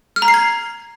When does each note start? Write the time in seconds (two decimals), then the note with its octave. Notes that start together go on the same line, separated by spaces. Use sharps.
0.16 F6
0.22 A#5
0.28 C7
0.34 G#6